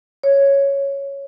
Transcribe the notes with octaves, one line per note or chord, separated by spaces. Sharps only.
C#5